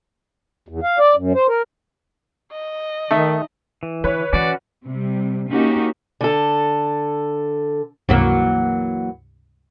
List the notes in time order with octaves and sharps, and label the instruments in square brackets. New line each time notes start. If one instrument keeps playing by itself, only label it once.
[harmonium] E2
F5
D5
F#2
C5
A#4
[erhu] D#5
[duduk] D#3 [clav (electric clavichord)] A3 [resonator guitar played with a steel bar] D#4 E5
[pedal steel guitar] E3
[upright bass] D3 [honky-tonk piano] B4 C#5
[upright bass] E3 [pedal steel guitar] C#4 F#4 [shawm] D5
[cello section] C3 G3
A#3 C#4 D#4 F#4 G4
[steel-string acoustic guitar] D3 A4
[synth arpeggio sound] C#2 G2 C3 [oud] E3 F#3 A#3